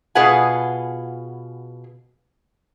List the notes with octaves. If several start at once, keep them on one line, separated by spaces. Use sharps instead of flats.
B2 F4 G#4 B4 F#5 G#5